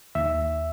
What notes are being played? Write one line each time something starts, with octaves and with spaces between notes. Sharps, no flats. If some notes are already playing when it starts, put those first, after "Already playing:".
D#2 E5